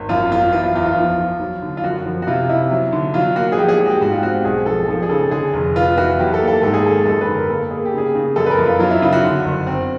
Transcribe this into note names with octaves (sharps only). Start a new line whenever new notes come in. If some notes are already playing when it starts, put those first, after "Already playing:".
Already playing: G#1
F#2 F4
F#3 F4
E3 F4
F4
E2 F4
F4
F3
F3
F#3
D3
F4
F#2 F#4
F3
F#4
C3 F4
C3 E4
F#3
D3
F#3 F4
A#3 F#4
G#4
F3 G4
G#4
G#3 G#4
F#4
G4
G#2 F#4
F4
C4 F#4
G4
B1 G#4
F3 A4
F3 A4
G#4
C#3 A4
D3 G#4
F1
B3 F4
E3 F#4
F#3 G4
A4
A#3
A4
G#2 A4
G#4
D#3 A4
F#2 A4
B4
D3
A#4
A#3 A4
A#3 G#4
G4
C#3 G#4
C#3
F#2 A4
B4
A#4
F#2
F4
F#3 F4
E4
C#3 F4
F#4
D3
F#1
C4